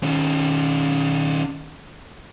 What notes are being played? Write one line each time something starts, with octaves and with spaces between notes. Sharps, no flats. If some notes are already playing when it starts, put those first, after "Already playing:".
D#3 C#4